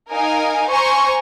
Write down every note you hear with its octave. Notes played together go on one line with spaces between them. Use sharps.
D#4 A#4 F5 G#5
C5 G#5 A#5 C#6